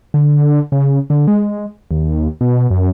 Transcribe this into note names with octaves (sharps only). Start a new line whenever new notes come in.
D3
C#3
D3
G#3
D#2
B2
F#2